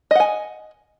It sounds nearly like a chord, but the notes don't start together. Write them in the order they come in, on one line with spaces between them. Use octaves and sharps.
D#5 F#5 G#5